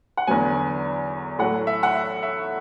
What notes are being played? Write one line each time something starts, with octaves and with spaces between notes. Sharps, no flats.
F#5
E2 D3 F#3 B3 G#5
A2 F#3 A3 F#5
E5
F#5
E5
E5